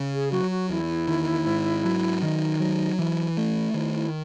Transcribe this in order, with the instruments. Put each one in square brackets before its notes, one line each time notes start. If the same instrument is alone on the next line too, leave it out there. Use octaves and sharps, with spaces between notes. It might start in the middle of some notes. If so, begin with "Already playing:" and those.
Already playing: [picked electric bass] C#3
[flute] G#4
[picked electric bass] F#3 [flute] F#4
[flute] F#4
[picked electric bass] E2 [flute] E4
[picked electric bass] D#3
G#2
F#3
[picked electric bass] D#3 [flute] D#4
[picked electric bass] F#3
[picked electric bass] E3 [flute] E4
[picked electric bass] A3
[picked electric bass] D#3 [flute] E4
[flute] E4